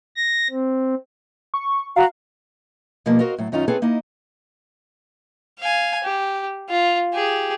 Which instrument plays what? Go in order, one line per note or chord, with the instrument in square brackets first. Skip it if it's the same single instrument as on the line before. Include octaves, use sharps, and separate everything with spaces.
[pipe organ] A#6
C4
[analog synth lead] C#6
[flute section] F#4 A#5 [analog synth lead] F5
[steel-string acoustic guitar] B2 F3 G3 A#3
F#4 A#4 C5 D#5 F5
A2 F#3
F#2 D#3 C#4 D#4 F4 A#5
C4 E4 G#4 A4 B4 C#5
A#3 D#4 E4 D#5
[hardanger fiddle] F5 G#5
G4
F4
G4 G#4